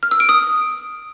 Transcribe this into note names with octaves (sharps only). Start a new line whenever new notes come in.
F6
E6
D7
D#6